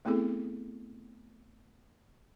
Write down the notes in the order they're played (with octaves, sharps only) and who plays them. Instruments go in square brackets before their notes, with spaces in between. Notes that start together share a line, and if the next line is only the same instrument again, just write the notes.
[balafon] A3 B3 C4 E4 G#4 A4